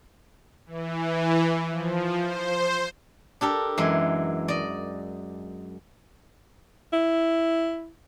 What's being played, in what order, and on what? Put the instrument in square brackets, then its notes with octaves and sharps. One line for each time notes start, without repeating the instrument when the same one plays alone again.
[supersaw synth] E3
F3
C5
[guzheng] D4 G4 A4 A#4
F#2 E3 G#3
D5 D#5
[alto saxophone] E4